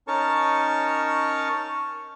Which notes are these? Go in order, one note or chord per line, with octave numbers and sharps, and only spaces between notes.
C#4 D#4 A#4 C#5 A5 C#6